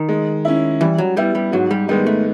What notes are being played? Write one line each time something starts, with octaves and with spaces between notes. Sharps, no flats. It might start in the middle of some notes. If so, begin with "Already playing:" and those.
Already playing: D#3
G#3
C#4 E4
E3 G3
F#3
G3 B3 E4
G3
G#2 F#3
G3
D#3 G3 G#3 B3 D#4
A3